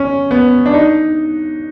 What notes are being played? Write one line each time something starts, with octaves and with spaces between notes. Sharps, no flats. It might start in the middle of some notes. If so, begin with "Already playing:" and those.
Already playing: C#4
B3
D4
D#4